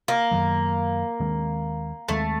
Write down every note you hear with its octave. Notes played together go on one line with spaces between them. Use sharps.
A#3
F#2 D#3 F#3
D#2 D#3 G#3 C4
D#2 D#3 G#3 A3 C4